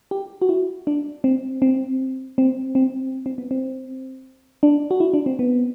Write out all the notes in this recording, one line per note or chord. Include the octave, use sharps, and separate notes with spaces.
G4
F#4
E4
D4
C4
C4
C4
C4
C4
B3
C4
D4
F#4
E4
D4
C4
B3